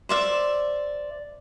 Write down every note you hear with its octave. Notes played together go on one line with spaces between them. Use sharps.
C5 D5 E5